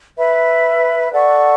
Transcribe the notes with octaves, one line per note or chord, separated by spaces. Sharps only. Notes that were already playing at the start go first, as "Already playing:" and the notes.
B4 E5 B5
A4 D5 F#5 C#6